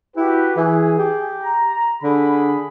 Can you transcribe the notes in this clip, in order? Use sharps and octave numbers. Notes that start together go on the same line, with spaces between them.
E4 F#4 G4 B4
E3 G#4
G4
A#5
D3 G#4 B5